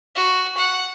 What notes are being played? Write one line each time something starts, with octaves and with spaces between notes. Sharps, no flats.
F#4
F#5